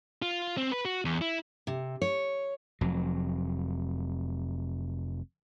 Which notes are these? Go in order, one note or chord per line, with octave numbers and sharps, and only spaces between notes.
F4
C4
B4
F#4
E2
E4
C3
C#5
F1 F2 F#3